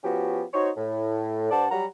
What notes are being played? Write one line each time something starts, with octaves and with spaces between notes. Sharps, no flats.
F3 B3 C#4 F#4 G4
D#4 F#4 C5 C#5
A2
G2 C5 D5 F#5 A5
F#3 G3 F#4 F#5 A#5